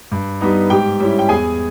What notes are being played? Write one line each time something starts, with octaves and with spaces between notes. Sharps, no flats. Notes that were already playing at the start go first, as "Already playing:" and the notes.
G2
G3 B3 D#4
G#2 G4 G5
G3 C#4 E4
G5
E2 G#4 G#5